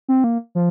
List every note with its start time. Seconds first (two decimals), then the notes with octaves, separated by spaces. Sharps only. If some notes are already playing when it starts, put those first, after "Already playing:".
0.09 C4
0.24 A#3
0.55 F3